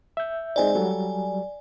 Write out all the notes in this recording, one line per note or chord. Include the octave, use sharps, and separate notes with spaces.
E5 G6
G#3 C4 D#4 D5 G#5
F#3 G3 A4